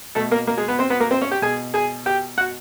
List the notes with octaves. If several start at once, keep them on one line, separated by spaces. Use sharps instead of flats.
B2 A3 A4
A#3 A#4
A#3 A#4
G#3 G#4
B3 B4
C4 C5
B3 B4
A#3 A#4
C4 C5
C#4 C#5
G4 G5
B2 G#4 G#5
G#4 G#5
G4 G5
F#4 F#5